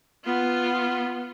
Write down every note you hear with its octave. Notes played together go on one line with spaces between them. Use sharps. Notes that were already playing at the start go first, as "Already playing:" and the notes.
B3 F4